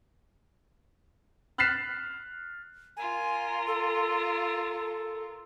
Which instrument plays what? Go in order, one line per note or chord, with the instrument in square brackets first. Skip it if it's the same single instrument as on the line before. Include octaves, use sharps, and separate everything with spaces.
[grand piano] F6 F#6 A6 B6 C7 E7
[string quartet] F4 A#4 [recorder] G#5
[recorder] A4